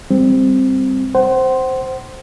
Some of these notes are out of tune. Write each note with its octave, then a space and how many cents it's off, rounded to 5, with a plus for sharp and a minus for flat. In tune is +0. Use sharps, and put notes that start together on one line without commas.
G3 +20 C4 +0
C5 +0 F#5 +35